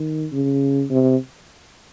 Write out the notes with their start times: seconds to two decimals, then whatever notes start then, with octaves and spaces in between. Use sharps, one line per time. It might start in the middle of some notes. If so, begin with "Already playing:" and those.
Already playing: D#3
0.32 C#3
0.90 C3